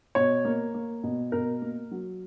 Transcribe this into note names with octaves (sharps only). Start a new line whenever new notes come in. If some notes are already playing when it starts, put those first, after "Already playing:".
B2 C#5
A#3
A#3
B2
B2 A#4
A#3
F#3